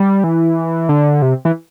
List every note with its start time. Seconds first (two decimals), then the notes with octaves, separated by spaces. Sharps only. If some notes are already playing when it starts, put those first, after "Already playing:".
Already playing: G3
0.24 E3
0.89 D3
1.22 C3
1.45 E3